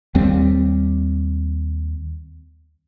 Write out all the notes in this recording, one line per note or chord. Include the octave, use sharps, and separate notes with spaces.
D#2 G3 C4